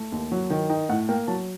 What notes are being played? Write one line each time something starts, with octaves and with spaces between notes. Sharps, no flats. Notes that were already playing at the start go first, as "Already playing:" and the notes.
Already playing: A3
D#2
F#3
D#3
D#4 G5
A2 F#5
A#3 G5
F#3 A5